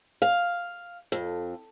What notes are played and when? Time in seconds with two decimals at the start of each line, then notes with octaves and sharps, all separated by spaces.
0.22 F5
1.12 F2